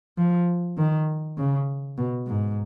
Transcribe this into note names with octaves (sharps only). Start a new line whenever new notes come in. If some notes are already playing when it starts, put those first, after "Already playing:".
F3
D#3
C#3
B2
G#2